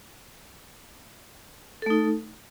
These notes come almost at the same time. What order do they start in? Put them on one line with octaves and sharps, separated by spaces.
A4 A3 D#4